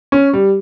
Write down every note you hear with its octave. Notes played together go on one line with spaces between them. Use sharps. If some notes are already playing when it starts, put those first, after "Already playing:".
C#4
G3